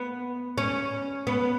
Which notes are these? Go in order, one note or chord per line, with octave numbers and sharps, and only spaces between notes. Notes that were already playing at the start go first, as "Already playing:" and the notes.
Already playing: B3
C#4
B3